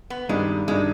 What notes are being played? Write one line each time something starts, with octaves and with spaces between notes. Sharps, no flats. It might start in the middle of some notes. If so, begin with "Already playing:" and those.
B3
G2 D#3 G3 G#3 D4
G2 D#3 G3 G#3 D4